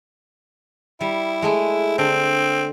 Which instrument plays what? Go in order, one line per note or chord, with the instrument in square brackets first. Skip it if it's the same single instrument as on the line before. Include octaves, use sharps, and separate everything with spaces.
[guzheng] G3 [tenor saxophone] E4
[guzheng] G#3 A3 G#4
[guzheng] D3 [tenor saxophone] C4